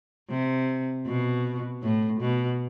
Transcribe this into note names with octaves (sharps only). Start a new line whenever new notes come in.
C3
B2
A2
B2